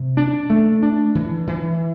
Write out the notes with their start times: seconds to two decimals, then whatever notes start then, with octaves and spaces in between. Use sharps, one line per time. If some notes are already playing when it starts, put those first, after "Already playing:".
Already playing: C3
0.17 D4
0.50 A3
0.83 D4
1.15 E3
1.47 E3